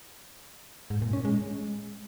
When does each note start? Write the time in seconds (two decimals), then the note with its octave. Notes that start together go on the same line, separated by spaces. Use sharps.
0.90 G#2
1.02 A#2
1.13 C#4
1.25 G#3